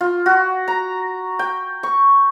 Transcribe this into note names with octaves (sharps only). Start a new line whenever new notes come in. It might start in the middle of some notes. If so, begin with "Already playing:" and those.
F4
F#4
A#5
G5
C#6